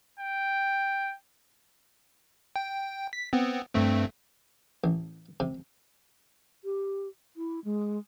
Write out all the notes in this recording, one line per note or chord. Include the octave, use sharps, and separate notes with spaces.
G5
G5
B6
B3 C4
G2 A3 C4
A1
C3
G4
E4
G#3